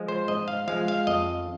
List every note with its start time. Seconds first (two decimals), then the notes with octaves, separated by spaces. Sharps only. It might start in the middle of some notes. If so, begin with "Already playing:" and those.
Already playing: F3 G#3
0.08 C5
0.28 G#2 D#5
0.48 F5
0.68 F3 G#3 F5
0.88 F5
1.07 F2 D#5